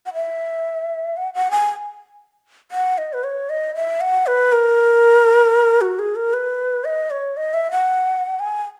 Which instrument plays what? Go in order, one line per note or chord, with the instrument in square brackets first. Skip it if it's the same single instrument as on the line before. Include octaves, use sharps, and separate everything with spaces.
[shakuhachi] F#5
E5
F#5
F#5
G#5
F#5
D#5
B4
C#5
D#5
E5
F#5
B4
A#4
F#4
G#4
A#4
B4
D#5
C#5
D#5
E5
F#5
G#5